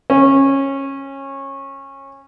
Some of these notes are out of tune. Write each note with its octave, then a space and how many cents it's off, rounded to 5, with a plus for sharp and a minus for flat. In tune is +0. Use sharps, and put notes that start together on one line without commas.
C#4 -20